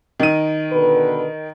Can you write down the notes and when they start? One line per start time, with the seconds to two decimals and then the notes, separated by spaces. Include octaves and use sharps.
0.20 D#3 D#7
0.72 B2 D3 B4